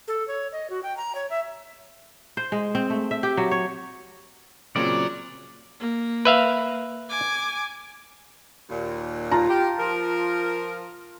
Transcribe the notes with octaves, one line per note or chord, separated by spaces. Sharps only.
A4
C#5
D#5
F#4
G5
A#5
C#5
E5
C5
G#3
C4
A3
E5
G4
F#3
C#5
A#2 C#3 F#3 C4 D5
A#3
B4 E5 F5
G#5 D6
D#2 A#2
F4 A5 A#5
G4
F3 A#4